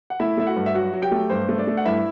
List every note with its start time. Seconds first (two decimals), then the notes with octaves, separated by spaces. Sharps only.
0.10 F#5
0.20 A3 E4 E5
0.37 A3 E5
0.47 F#4 F#5
0.56 G2
0.66 E5
0.74 F#3 F#4 F#5
0.93 F#3
1.02 G4 G5
1.12 A3
1.30 G2 C5
1.49 A3
1.58 D4 D5
1.67 A3
1.77 F#5
1.85 G2 E4 E5